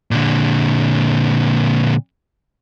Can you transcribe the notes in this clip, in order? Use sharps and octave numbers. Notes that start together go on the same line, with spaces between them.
A#2 D3